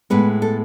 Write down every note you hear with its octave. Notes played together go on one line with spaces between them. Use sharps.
A2 G#3 B3 B4
A4